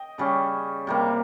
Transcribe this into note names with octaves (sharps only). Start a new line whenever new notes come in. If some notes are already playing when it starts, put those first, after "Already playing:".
Already playing: D#5 G5
C#3 G3 C#4
C3 G3 A#3